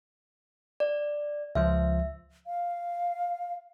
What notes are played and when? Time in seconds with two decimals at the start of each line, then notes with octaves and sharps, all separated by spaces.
0.80 D5
1.55 C#2 F3 F4 E5
2.47 F5